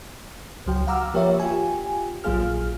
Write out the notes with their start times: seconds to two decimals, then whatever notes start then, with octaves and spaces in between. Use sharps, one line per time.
0.66 C#2 F#3 G5
0.87 F5 F#5 A#5 D6 E6 F6
1.14 F3 A#3 G4 A#4 C#5 E5
1.40 F4 G4 G#5
2.24 A#1 F#3 A#3 F4 G#4 F6